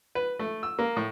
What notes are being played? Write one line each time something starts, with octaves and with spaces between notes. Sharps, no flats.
B4
A3
E6
A#3
A2